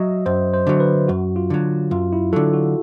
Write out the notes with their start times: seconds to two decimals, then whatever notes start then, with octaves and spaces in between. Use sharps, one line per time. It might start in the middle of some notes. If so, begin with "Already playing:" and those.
Already playing: F#3 D#5 E5
0.26 F#2 C5
0.54 C5
0.67 D3 F#3
0.80 B4
1.08 F#2 F#4
1.36 F4
1.50 D3 F#3
1.91 F#2 F4
2.13 E4
2.33 D3 F#3 A4
2.53 F#4